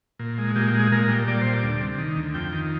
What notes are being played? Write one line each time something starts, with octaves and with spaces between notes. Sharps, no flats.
A#2
G#3
A#2 G4
G4
G#3
G#4
A#2 A#4
G3
A#2 D5
G3 C5
D5
D2
C3
D#3
D2
F2 G5
D#3